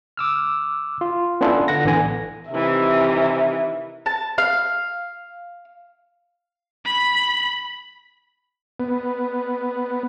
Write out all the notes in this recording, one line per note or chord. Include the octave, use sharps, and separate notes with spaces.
D6 E6 F6
F4
B3 C#4 D4 E4 F4 A4
D3 F#5 A#6
A1 D3 E3 B3 G#5 A#6
C3 D#3 E3 E5
A5
F5
B5
B3